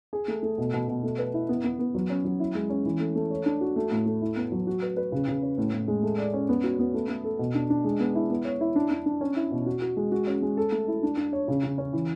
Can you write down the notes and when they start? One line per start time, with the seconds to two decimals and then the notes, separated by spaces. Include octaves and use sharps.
0.13 G#4
0.28 A3
0.43 A3
0.58 B2
0.73 B2
0.88 B2
1.03 A3
1.19 B4
1.34 E4
1.49 B3
1.64 B3
1.79 B3
1.95 F#3
2.10 C#4
2.25 F#3
2.40 E4
2.55 G#3
2.70 C#4
2.85 E3
3.00 A3
3.15 A3
3.30 C#5
3.46 D4
3.61 F#4
3.76 A3
3.91 A2
4.06 A3
4.22 E4
4.37 B3
4.52 F#3
4.67 F#4
4.82 B4
4.97 B4
5.12 C#3
5.28 C#3
5.42 C#4
5.58 A2
5.73 A2
5.88 G#3
6.03 A3
6.18 D5
6.33 C#4
6.49 B3
6.64 F#4
6.79 B3
6.94 A3
7.09 A3
7.24 A4
7.39 B2
7.55 D4
7.70 D4
7.85 G#3
8.00 B3
8.15 E4
8.30 B3
8.45 C#5
8.61 E4
8.76 D4
8.91 D4
9.06 D4
9.21 C#4
9.36 E4
9.51 B2
9.66 F#4
9.82 F#4
9.97 G#3
10.12 F#4
10.27 C#4
10.42 G#3
10.57 A4
10.72 A3
10.88 E4
11.03 D4
11.17 D4
11.33 C#5
11.48 C#3
11.63 C#3
11.78 C#4
11.93 E3